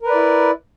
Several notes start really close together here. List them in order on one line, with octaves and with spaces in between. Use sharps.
A#4 B4 D5 E4